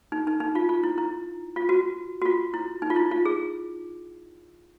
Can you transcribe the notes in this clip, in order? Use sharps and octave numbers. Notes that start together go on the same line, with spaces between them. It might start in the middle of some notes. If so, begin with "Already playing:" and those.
D#4
D#4
D#4
F4
F4
E4
E4
F4
F#4
F#4
F4
E4
D#4
F4
E4
F4
G#4